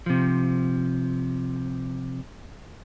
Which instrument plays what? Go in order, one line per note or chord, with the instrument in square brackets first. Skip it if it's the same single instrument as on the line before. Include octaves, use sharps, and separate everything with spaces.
[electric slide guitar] C3 F3